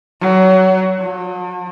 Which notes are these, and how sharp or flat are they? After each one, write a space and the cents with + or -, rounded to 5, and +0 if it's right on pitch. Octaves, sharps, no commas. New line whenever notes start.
F#3 +20
F#3 -45